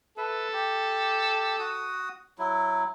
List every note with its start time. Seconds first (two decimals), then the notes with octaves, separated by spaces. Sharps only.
0.18 A4 B4 E5
0.53 G4
1.59 F#4 D#6
2.39 F#3 E4